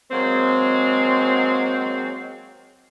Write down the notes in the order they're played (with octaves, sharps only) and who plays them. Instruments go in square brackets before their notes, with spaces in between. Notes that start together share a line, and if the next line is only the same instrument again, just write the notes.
[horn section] F#3 G#3 A#3 C4